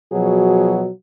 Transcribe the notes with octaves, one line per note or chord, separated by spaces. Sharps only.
B2 F3 F#3 F#4 G#4